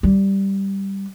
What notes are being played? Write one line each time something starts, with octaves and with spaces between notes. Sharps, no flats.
G3